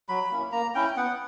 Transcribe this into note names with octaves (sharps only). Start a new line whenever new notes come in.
F#3 B5
A#3 C#4 E4
A#3 A#5
C#4 E4 G5
B3 F#5